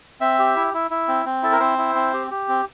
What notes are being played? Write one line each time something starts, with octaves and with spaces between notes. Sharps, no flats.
C4 E5
G4
E4
E4
E4
C4
C4
E4 A4
A#4
C4 C5
E4
C4
G4
G4
C4